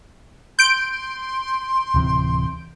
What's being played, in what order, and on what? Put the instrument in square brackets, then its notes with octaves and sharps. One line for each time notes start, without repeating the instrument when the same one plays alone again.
[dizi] C6 [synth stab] G6 D7
[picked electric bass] D1 C3 E3